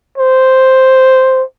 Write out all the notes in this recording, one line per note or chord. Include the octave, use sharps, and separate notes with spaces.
C5